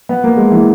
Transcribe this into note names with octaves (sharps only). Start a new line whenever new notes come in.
B3
A#3
G#3
E3